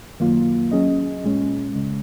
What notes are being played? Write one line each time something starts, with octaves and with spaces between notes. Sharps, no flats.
F#2 D#3 F#3 A#3 F4
F#3 C#4 G#4 D#5
A#2 G#3 C#4
C#2 C#3 G#3